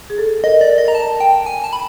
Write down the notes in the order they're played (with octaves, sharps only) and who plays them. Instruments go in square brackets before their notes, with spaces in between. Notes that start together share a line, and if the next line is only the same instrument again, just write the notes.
[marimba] G#4
A4
[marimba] A#4 [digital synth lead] D#5
[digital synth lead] D5
[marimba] A#4
[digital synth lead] D#5
A#5
A5
G5
G#5
A5
B5